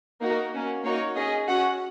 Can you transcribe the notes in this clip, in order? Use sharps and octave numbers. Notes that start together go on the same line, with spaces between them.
A#3 D#4 F#4 A#4
A#3 C#4 F#4
A#3 D#4 F#4 C#5
C#4 G#4 D#5
C#4 F#4 F#5